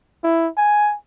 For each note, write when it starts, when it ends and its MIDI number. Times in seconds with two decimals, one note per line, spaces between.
0.24 0.49 64
0.57 0.95 80